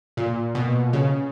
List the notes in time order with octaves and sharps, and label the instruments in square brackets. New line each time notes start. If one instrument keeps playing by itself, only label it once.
[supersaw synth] A#2
B2
C#3